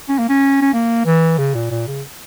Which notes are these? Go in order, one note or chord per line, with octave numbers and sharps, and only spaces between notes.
C#4
A#3
C#4
C#4
A#3
E3
C#3
A#2
A#2
C#3